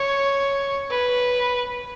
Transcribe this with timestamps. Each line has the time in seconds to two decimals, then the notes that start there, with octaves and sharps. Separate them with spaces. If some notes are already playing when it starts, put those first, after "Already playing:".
Already playing: C#5
0.90 B4